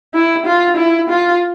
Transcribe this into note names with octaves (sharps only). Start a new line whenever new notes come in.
E4
F4
E4
F4